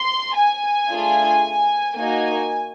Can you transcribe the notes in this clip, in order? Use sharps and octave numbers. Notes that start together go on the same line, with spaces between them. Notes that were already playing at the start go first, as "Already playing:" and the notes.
Already playing: C6
G#5
A3 D4 F4 G#4
A#3 D#4 F#4 G#5